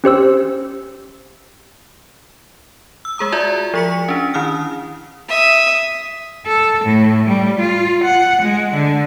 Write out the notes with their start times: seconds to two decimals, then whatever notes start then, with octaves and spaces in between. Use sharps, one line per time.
0.04 C#4 G4 C5 E6
3.05 E6
3.18 G#3 G#4 A#5 D#6
3.32 F4 F#4 D5 E5 A5 A#5
3.74 F3 G#4 C#6 B6 C#7
4.09 C#4 D4
4.34 D#3 E4 D#6 F6
5.28 E5 D#6
6.46 A4
6.85 A2
7.27 G3
7.60 F4
8.04 F#5
8.42 G#3
8.75 D3